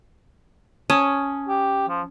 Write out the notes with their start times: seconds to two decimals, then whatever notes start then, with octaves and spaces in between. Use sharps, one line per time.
0.90 C#4 A5 D#6 D#7
1.48 G4
1.88 F3